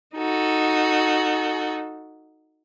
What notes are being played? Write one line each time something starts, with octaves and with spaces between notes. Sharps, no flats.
D#4 F#4 A4